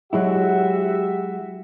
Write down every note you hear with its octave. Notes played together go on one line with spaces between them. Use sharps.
F#3 G#3 E4 F#4 G4 E5